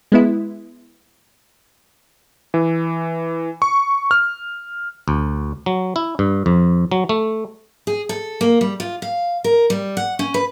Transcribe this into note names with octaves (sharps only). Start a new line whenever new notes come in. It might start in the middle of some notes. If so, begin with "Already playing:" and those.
G#3 B3 E4
E3
C#6
F6
D2
F#3
E4
G2
F2
F#3
A3
G#4
A4
A#3
G3
F4
F5
A#4
G3
F#5
C#4
B4